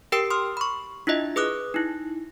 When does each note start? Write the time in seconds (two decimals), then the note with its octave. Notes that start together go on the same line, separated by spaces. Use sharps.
0.12 G4 A#4 G5 E6 C7 D7
0.30 C6 D#6 F6
0.57 B5 C#6
1.07 D4 E4 F4 D#5 E5
1.36 G#4 B4 D6 D#6 F#6
1.74 D#4 E4